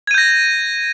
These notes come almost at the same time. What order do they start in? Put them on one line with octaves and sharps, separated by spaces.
G#6 D#7 G6 A#6